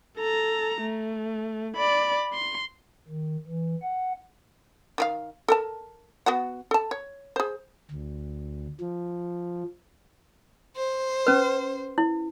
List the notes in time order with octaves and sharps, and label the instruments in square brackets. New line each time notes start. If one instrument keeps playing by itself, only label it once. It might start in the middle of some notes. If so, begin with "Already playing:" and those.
[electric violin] A4 A#5
A3
D5 B5
C6
[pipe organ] D#3
E3
F#5
[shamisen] D#3 G4 F5
A4 A#4 A5
B3 F#4 F#5
A4 A5
C#5
G#4 C5
[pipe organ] D2
F3
[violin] C5
[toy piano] C#4 B4
E4